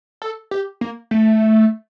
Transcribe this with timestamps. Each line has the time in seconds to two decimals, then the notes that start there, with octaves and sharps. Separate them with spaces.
0.22 A4
0.51 G4
0.81 A#3
1.11 A3